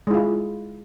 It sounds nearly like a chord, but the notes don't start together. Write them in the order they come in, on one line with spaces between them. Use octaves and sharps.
G#3 E4 F4